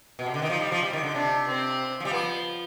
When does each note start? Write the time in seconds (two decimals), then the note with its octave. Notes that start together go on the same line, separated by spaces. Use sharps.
0.19 B2
0.26 C3
0.34 D3
0.42 D#3
0.50 F3 D#4
0.60 G3
0.72 F3
0.83 G3
0.93 D#3
1.03 D3
1.14 C3 D4
1.46 C4
2.00 F3
2.05 G3
2.11 F3 B3